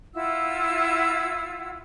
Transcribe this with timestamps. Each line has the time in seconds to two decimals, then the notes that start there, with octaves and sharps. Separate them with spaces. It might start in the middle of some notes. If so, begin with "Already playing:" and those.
0.14 E4 F4 F#5 E6